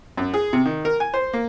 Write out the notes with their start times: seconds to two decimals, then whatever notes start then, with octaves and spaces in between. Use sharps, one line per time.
0.17 F#2
0.34 G#4
0.53 C3
0.65 D#3
0.85 A#4
1.00 G#5
1.14 C5
1.33 A#3